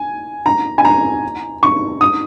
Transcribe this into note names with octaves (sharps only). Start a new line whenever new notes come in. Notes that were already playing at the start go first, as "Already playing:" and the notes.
Already playing: G#5
A#5
G#5
A#5
C#6
D#6